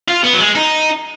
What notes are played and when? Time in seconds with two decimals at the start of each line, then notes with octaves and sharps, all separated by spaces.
0.08 F4
0.24 B3
0.34 F#3
0.40 G#3
0.55 D#4